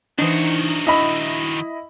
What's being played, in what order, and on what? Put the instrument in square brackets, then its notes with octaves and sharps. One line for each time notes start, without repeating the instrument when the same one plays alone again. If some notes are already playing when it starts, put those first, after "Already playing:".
[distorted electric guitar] D#3 F#4 [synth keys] E3 D#4 [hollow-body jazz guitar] D4 C5
[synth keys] E4 [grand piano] D#5 B5